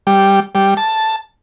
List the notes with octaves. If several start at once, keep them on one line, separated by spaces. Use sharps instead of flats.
G3
G3
A5